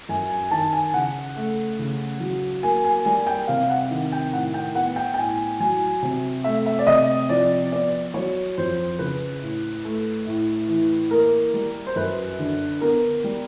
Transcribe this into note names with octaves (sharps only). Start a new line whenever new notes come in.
F#2 G#5
G#5
D#3 A5
G#5
C#3 F#5
A3
C#3
F#3
A#3 G#5
G#5
G3 G#5
G5
C3 F5
F#5
D#3
G5
A2 F#5
G5
B3 F#5
G5
G5
A2 G#5
F#3 G#5
C3
A3 E5
E5
D5
C3 D#5
F3 D5
B3 D5
F#3 C#5
F2 C5
C#3 B4
A2
A3
A2
E3
A#3 A#4
G3
C5
F#2 B4
D3
B3 A#4
G3